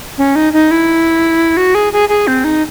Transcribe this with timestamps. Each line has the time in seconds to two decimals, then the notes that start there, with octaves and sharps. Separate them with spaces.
0.18 C#4
0.36 D#4
0.53 D#4
0.71 E4
1.57 F#4
1.75 G#4
1.93 G#4
2.09 G#4
2.27 C4
2.44 D#4